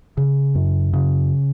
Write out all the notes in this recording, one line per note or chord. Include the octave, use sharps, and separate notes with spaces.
C#3
F#2
C#3